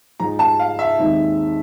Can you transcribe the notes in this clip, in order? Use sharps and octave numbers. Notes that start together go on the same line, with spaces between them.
G#2 F3 G#3 A#5
A5
F5
E5
D#2 D#3 G#3 C4 D#4